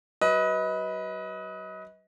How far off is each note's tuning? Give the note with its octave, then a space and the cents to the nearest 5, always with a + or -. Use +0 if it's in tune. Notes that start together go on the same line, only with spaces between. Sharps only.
F#3 +35 B4 -5 D#5 +30